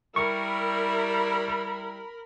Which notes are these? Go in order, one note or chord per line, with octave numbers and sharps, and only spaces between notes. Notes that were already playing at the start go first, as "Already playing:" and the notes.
G3 E4 A#4 B5 C#6